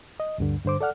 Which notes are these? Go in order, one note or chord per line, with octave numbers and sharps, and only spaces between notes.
D#5
D2 G2 D3
G2 D3 C5 D6
A4 D5 F#5 F6